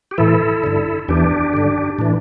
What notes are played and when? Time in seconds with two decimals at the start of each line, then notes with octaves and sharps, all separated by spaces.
0.11 G4
0.18 A2 E3 E4 A4
0.64 G2 D3
1.08 E2 E3 D4 G4
1.53 G2 D3
1.98 A2 E3 D4